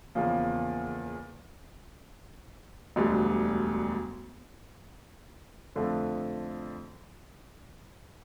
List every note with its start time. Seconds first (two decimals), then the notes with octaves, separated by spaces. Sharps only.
0.15 E2 C#3 F3 A#3
2.96 E1 D2 D3 G3
5.75 F2 D3 F3 A3